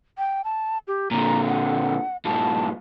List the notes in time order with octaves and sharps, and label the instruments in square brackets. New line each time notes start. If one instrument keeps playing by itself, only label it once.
[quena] G5
A5
G4
[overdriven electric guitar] A#2 D3 [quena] A#5
[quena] F#5
[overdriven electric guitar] G2 A#2 [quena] A5